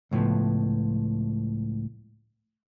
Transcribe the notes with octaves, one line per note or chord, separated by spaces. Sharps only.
C#2 A2 E3 F3 B3